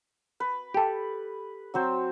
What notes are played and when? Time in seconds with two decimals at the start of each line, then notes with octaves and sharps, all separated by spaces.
0.40 B4
0.74 G4 A4
1.74 F#3 C4 C5